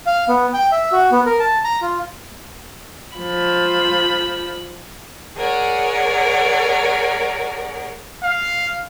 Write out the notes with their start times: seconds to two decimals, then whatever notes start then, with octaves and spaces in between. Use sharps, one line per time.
0.07 F5
0.28 B3
0.53 G5
0.72 E5
0.92 F#4
1.12 B3
1.26 A#4
1.40 A5
1.64 A#5
1.82 F4
3.17 F3 B5
5.37 G#4 A#4 C#5 D5 F#5
8.23 F5